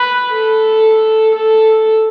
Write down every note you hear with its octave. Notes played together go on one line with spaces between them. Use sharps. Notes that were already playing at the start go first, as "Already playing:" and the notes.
Already playing: B4
A4
A4